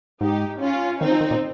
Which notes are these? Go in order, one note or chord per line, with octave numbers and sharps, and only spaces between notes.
G#2 D#4 G4
C#4 F4
D#3 C4 D#4
F3
D#3
A#2